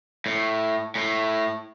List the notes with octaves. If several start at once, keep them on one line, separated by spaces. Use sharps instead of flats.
A2
A2